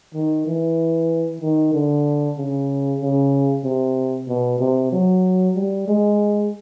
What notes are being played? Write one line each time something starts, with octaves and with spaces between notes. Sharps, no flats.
D#3
E3
D#3
D3
C#3
C#3
C3
B2
C3
F#3
G3
G#3